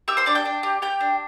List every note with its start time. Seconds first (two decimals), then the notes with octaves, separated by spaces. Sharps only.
0.08 G4 E5 E6
0.17 C5 C6
0.26 D4 D5 D6
0.35 G5 G6
0.45 D4
0.63 G4
0.82 G4 G5 G6
1.01 D4